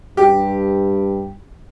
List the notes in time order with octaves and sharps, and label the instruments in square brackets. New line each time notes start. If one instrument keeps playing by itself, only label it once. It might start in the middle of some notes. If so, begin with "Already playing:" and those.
[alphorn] G2 [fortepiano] G4